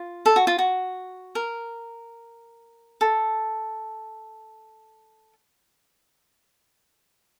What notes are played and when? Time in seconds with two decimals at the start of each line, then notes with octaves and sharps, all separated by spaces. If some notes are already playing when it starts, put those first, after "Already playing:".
Already playing: F4
0.26 A4
0.36 F#4
0.47 F4
0.59 F#4
1.35 A#4
3.01 A4